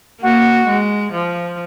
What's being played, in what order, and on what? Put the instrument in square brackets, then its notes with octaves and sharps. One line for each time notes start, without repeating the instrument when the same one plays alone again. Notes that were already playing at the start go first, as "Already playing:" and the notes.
[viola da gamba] A#3 [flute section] F#4
[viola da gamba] G#3
F3